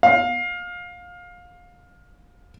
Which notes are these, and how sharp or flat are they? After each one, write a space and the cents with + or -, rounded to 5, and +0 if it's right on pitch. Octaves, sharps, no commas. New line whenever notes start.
F5 +25